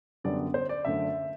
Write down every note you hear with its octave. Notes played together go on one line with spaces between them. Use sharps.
F#2 D3 G3 B3 D5
C5
D5
F#2 D3 A3 E5